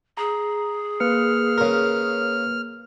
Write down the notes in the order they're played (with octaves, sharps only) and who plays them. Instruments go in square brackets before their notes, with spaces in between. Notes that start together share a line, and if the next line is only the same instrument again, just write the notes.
[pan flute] G#4 [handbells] A#5
[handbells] A#3 B4 C#7 [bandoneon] F6
[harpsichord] C#3 A#4